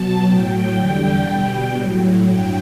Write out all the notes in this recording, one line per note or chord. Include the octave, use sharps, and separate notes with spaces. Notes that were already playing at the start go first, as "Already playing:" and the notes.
Already playing: B2 F#3 A5
A2 F#3 G5
E2 D3 G3
B2 G3
A2 F#3
G2 F#3 G5